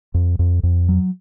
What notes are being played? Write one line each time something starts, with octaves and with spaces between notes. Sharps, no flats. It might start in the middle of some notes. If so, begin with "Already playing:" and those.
F2
F2
F2
F#3